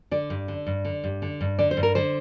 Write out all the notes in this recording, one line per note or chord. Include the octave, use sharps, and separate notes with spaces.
D3 D5
G2
D3
G2
D3
G2
D3
G2
D3 D5
C5
G2
A#4
D3 C5